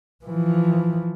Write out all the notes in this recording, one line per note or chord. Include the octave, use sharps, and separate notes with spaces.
E3 F3